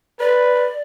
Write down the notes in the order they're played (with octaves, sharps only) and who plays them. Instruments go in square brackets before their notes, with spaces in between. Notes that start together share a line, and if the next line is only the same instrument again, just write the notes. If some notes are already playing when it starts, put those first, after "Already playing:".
[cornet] B4 [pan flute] D5